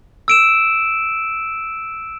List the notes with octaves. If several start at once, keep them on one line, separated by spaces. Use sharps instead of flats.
E6 D7 E7